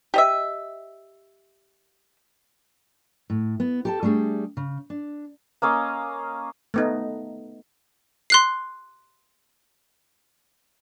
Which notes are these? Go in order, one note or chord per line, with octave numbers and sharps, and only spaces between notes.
G4 D#5 E5
A2
B3
G4 A4 A5
G3 A3 D4 G#4
C#3
D4
A#3 C#4 D#5 F5
A3 B3 D#4
C6 F#6 C7